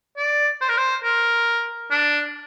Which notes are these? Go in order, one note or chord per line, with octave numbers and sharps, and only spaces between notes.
D5
C5
A#4
C5
A#4
D4